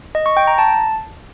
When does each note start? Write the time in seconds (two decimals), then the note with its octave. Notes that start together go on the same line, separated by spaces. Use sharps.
0.15 D#5
0.26 C#6
0.37 G5
0.47 A#5
0.58 A5